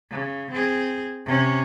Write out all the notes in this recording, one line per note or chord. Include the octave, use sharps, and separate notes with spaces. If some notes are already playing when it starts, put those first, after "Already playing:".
C#3
C4 G#4
C3 C#4